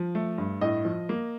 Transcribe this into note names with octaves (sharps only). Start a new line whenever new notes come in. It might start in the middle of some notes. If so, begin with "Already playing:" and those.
Already playing: F3
A3
G2
A2 D#5
F3
A#3